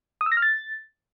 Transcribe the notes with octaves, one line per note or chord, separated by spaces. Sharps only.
D#6
E6
A#6
F6
A6